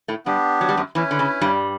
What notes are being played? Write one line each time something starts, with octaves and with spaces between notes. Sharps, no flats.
A2 A3
G2 G3 B3 D4 G4
F#3
G3
F#2 F#3
E2 E3 C#4 E4 B4
D3
C#3
G2 G3